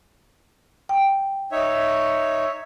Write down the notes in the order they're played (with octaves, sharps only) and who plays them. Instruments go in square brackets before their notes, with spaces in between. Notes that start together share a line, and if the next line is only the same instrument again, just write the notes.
[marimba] G5
[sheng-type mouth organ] D#4 C#5 E5